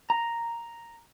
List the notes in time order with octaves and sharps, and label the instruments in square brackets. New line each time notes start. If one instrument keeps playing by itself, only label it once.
[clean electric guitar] A#5